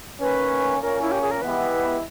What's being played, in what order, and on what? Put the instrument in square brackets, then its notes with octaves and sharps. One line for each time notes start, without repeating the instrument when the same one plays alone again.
[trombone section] D#3 A#3 C#4 [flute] B4
[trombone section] A#2 A#3 C#4 [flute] A#4
[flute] E4
G4
G#4
A#4
[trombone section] E3 G#3 B3 E4 G4 [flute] B4